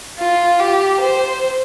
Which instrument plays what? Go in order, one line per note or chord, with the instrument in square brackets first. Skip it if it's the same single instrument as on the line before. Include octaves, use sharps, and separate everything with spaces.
[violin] F4
G4
C5